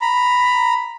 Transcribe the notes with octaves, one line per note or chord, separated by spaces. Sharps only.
A#5 B5